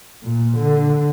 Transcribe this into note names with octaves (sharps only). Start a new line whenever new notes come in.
A#2
D3